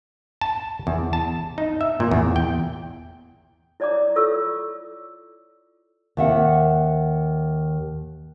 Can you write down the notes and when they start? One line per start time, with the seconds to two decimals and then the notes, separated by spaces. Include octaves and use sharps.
0.41 A5
0.87 E2
1.13 A5
1.58 D#4
1.81 E5
2.00 A#2
2.11 E2
2.36 G5
3.80 E4 C#5 D5 A#5 D6
4.16 F4 A4 C#5 C#6 E6
6.17 D#2 E5 F#5